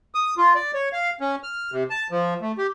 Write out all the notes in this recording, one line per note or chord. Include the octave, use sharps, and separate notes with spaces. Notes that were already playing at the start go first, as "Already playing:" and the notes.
D#6
F4
D5
C#5
F5
C#4
F6
C3
A5
F3
A3
G4